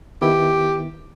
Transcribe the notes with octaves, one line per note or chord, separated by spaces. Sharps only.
D#3 B3 E4 G4